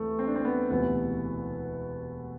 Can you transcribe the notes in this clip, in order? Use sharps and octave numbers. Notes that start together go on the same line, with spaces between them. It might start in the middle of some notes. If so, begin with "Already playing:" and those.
Already playing: D2 C3 E3 A3
C4
D4
C4
B3
E1 D2 C3 E3 B3